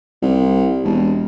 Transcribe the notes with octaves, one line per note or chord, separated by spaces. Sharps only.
C2
E1